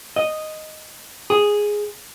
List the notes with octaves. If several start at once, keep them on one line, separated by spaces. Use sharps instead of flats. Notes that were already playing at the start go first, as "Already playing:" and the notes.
D#5
G#4